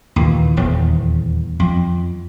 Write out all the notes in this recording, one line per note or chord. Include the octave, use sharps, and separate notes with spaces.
D#2 A#2 E3
D#1 E2
F2